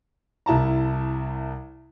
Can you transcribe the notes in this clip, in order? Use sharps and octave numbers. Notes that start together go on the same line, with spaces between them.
C2 E4 A5 A#5